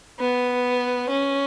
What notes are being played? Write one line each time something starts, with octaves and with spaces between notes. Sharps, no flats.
B3
C#4